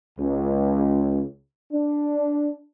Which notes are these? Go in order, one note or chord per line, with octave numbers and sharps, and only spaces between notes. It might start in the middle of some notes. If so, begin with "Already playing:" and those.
C#2
D4